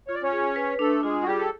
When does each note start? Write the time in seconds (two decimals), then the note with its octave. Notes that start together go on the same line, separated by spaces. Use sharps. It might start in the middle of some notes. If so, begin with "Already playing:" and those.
0.08 F4 C#5
0.15 D5
0.23 C#4 C#5
0.32 G#4
0.56 B4
0.79 A3 D4 A4
1.03 G#3 F4 G#4
1.22 F#4
1.27 G3 G4 G#4
1.39 A4